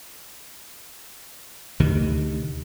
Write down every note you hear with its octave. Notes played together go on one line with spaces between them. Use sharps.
D2 C3 D#3